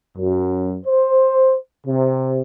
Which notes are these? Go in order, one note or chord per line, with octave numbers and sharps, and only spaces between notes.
F#2
C5
C3